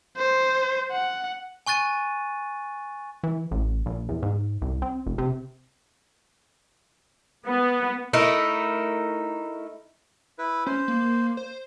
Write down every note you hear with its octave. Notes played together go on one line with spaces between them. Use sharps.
C5
F#5
G#5 C#6 F#6 A6 D#7
E3
A1
A#1
E2
G#2
C2
C4
F1
C3
B3
A3 D#4 E4 A#4
E4 B4
C#4 C5
A#3
C5